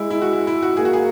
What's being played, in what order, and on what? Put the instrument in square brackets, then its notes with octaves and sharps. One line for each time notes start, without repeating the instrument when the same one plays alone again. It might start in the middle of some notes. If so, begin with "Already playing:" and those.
Already playing: [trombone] G#3 [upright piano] E4
[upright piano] E4
F#4
E4
E4
F#4
[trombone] A#3 [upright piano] G#4
[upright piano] F#4
G#4